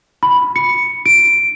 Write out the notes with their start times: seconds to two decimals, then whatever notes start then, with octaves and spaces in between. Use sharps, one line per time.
0.23 B5
0.56 C#7
1.06 D7